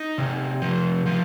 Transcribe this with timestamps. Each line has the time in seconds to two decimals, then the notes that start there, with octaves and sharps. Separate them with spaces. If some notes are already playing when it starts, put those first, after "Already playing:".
Already playing: D#4
0.18 C3
0.62 F3
1.06 F3